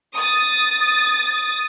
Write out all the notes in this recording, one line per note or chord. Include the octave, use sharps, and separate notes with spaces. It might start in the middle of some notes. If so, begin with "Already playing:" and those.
D#6 A6